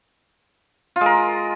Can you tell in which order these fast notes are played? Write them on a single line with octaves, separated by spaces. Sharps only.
F4 G#3 A#4